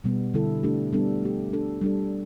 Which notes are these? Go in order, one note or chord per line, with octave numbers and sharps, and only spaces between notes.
B2 G3 B3
D3 G3 E4 A4
A3 D4 G4
G3 B3 D4 A4
A3 G4
A3 D4 A4
G3 D4 A4